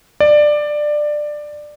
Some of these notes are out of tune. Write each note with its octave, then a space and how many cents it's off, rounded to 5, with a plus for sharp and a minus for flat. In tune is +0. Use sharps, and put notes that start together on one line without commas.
D5 +15